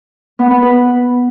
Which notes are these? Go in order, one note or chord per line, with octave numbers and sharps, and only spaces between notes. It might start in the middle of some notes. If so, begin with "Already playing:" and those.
B3
B3
B4